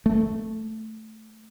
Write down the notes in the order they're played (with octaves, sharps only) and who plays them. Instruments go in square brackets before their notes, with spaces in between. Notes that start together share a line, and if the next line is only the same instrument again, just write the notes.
[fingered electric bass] A3